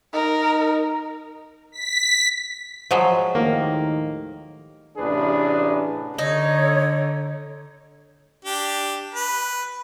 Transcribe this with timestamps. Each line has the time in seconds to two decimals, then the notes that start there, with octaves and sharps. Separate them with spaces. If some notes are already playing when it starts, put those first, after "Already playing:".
0.14 D#4 A#4
1.72 B6
2.91 F3 F#3 G#3
3.35 D#2 A2 D#3 A#3
4.97 A1 C3 D4 G#4 B4
6.18 D3 D#4 C#5
8.45 D4 G4
9.15 B4